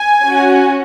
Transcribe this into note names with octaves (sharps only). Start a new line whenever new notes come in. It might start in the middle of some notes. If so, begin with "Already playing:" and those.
Already playing: G#5
C#4 F#4